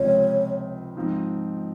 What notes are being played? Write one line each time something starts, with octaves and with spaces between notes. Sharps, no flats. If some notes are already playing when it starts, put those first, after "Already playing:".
Already playing: C#2 C3 F3 C4 C#5
G#2 F3 C4 D#4